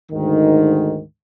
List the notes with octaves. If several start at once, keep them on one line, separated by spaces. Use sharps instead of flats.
D2 G#2 D#3